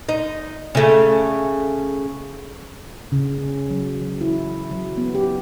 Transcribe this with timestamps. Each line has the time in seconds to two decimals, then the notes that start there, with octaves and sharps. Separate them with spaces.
0.09 D#4
0.75 C#3 A3
3.12 C#3
3.38 C#4
3.70 F#3
4.02 F#3
4.21 E4
4.71 F#3
4.97 B3
5.15 G4